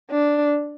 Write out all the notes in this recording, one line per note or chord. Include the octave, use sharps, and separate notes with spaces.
D4